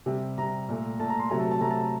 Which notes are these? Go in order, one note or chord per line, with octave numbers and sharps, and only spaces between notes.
C3 G3
C3 G3 A#5
A#2 A3
A#2 A3 A5
A#5
C6
C3 F#3 A3 A#5
A5
A5
C3 F#3 A3 A#5
A5
A#5